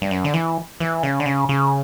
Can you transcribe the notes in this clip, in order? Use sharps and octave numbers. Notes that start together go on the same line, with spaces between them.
G2
F#2
D3
E3
E3
C#3
D3
C#3
C#3